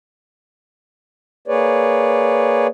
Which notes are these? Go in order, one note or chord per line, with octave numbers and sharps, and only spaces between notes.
A#3 G#4 B4 C#5 D5